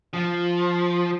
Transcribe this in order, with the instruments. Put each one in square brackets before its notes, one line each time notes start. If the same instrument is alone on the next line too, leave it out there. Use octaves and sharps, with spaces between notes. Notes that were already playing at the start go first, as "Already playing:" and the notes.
[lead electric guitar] F3